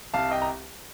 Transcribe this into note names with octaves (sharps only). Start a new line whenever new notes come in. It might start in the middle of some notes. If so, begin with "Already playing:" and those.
C2 F5 A5
D#5 G5
A#5